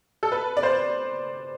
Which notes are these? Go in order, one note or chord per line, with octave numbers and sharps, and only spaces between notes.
A4
B4
D5
C5